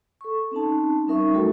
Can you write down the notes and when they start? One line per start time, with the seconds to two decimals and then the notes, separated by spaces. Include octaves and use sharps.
0.21 A4 C#6
0.51 C4 C#4 D#4 A5
1.07 G3 C#4 D#4 A#4 E5 C#6
1.33 F#3 A3 F#4 A4 G5